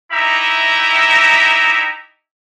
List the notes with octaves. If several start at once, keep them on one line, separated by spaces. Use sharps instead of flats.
D#4 E4 G4 E5 A#5